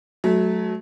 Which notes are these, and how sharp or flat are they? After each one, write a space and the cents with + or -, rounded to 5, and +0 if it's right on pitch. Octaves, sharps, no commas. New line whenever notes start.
F#3 +0 A3 -25